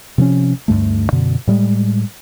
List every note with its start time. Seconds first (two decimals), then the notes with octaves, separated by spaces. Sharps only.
0.18 C3 F3 C4 C#4
0.68 D2 G2 G3 A3
1.12 F#2 B2 D3
1.47 A2 G3 G#3